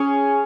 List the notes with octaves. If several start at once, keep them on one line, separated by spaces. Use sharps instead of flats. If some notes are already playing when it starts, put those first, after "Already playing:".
Already playing: C#4 G#4 C#5